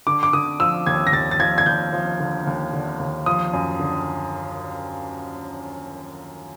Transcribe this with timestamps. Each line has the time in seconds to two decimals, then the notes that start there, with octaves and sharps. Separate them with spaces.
0.07 D3 D6
0.23 D6
0.33 D3 D#6
0.60 F3 E6
0.86 D#2 G#6
1.07 A#6
1.13 D#2 A6
1.31 A6
1.40 F3 G#6
1.58 G#6
1.66 D#2 G6
1.93 F3
2.20 D3
2.47 D#2
2.73 D3
3.00 D#2
3.26 F3 D#6
3.53 F#2
3.79 D3